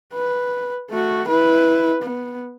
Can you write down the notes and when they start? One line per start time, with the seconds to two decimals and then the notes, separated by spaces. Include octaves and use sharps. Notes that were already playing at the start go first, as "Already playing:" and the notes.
0.14 B4
0.90 A3 F#4
1.28 E4 B4
2.02 B3